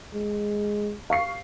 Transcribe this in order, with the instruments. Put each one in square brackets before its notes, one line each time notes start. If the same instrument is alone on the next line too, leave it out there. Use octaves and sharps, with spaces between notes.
[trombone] G#3
[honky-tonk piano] F5 C#6 C7